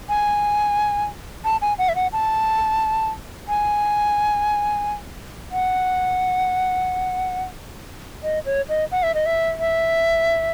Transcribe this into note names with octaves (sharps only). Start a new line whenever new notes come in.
G#5
A5
G#5
F#5
E5
F#5
A5
G#5
F#5
D#5
C#5
D#5
F#5
E5
D#5
E5
E5